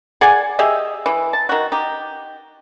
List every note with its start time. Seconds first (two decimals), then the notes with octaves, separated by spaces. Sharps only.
0.21 G#4 D5 F#5 G#5
0.59 G4 G#4 D#5 E5
1.06 E3
1.33 A5
1.49 D#3 F#4
1.72 D#4 G4